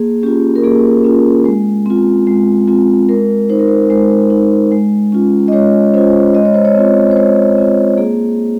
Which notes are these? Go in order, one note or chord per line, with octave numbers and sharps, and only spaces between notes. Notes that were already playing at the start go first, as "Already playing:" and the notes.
Already playing: A#3 G#4
C#4 F4 G4
A#4
A#3 G#4
C#4 F4
G#3
C4 F4
G#3
C4 F4
G#3 A#4
D#4 C5
A#4
C5
G#3 C5
D#4
G#3
C#4 F4
D#5
G#3 C#5
C#4 F4 C5
G#3 D#5
C#5
C5
C#5
C4 F4
C5
G#3 C#5
C4 F4
A#3 G#4